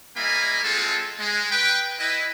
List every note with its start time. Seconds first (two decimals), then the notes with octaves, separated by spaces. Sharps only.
0.16 G3 A#3 E4 D#5 G#5 B5
0.63 G#3 C4 F4 G#4 A4
1.18 G#3
1.51 B4 G5
1.99 E4 B4 D#5